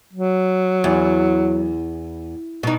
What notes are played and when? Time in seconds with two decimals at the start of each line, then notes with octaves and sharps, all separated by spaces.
0.13 F#3
0.84 E2
2.63 B2 D#4